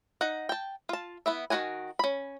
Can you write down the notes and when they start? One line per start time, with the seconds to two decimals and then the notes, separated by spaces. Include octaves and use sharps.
0.21 D#4 F#5
0.49 G5 A5
0.89 F4 A5
1.26 B3 E4 E5
1.50 D#3 E4 F#4 F#5 G#5
1.99 C#4 B5